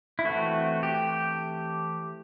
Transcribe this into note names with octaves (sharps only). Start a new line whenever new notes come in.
E4
E3 A3 C4 F#4
G4